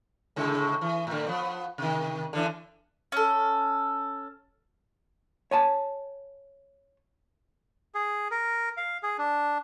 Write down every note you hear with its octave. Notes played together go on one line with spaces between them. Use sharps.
A2 C#3 G#3
E3
A2 D3
F3 B3
C3 D#3
D3 E3 D4
C#4 A4
C#5 G#5 A5
G#4
A#4
F5
G#4
D4